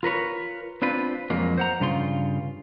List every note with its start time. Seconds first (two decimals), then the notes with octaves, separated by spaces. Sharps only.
0.03 F4 A#4 B4 C#5
0.82 C4 D4 F4 B4
1.30 F2 F#3 G#3 A#3
1.58 C5 F#5 A#5
1.80 G2 C#3 F4 C6